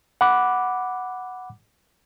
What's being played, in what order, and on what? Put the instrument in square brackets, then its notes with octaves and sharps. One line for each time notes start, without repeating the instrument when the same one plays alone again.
[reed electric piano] F#5 B5 D6 F#6